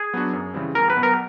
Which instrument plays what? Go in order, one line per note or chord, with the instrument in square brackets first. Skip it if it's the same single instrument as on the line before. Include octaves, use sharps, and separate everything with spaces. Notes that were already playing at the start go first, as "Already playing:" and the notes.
Already playing: [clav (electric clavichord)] G#4
[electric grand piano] F#3 B3 D4 F#4
F#2
C#3 E3 G3 C4
[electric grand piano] E2 [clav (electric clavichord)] A#4
[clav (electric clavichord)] B4
[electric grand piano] B2 F#3 B3
[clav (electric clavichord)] A#4